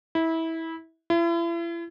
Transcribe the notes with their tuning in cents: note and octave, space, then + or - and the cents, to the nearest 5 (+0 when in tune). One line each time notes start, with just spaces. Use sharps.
E4 -20
E4 +40